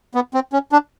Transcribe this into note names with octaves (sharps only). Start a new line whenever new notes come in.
B3
C4
C#4
D4